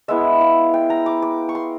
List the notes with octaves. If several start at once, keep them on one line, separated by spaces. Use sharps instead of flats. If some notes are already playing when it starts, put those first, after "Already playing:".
G#3 B3 E4 E5
F5
G5
A#5
D6
D6
C#6
C6